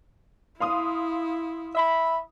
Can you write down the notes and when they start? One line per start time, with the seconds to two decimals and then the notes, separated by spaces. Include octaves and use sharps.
0.60 E4 F5 C6 D#6
1.75 E5 B5